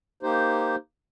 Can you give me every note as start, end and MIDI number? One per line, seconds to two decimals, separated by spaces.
0.23 0.76 58
0.23 0.76 63
0.23 0.76 67
0.23 0.76 72